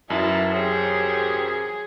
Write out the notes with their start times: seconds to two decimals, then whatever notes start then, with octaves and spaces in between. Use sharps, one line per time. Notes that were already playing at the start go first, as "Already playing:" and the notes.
0.10 F#2 E3 D#4 E4 A5
0.53 G4 G#4 C5 C#5